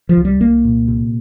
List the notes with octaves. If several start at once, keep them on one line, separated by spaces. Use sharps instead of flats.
F3
C2
G3
C2 A#3
A#2
C3